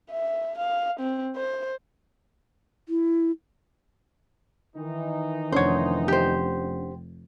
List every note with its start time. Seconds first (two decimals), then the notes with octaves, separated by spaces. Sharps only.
0.10 E5
0.58 F5
1.00 C4
1.36 C5
2.89 E4
4.76 D#3 E3 D#4
5.52 F1 C#4 D4 C5 C#5 F#5
6.08 G4 C5